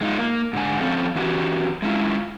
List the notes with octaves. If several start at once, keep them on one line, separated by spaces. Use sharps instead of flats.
G#3 D#4 F4
A#3
G#2 D3 G#5
F3 C4 C#4 A4 F5
E3 C#4 F#4 G4
G#3 A3 C#4 E4 F4